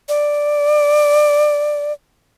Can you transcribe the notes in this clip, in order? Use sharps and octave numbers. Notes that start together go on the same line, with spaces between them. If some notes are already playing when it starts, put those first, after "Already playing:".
D5